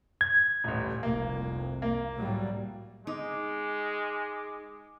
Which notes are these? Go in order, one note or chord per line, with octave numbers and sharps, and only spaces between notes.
G#6
D#1 A1
F1 C2 F2 A#3
A#3
A2 F#3 G3
G#3 D#4 D6